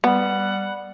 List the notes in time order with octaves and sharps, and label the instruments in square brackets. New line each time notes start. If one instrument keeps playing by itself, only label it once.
[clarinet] G3 [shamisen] B3 [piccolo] F#5